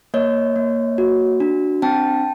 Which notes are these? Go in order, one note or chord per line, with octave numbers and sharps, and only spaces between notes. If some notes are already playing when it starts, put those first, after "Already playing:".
A#3 C#5 D#5
A#3
F#4
D4
C4 G5 A5